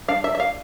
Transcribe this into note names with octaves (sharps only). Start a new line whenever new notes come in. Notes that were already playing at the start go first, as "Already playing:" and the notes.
G3 D4 F5
E5
E5
F5